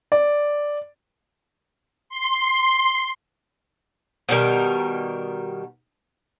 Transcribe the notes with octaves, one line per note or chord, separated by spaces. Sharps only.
D5
C6
B2 D#3 G3 A#4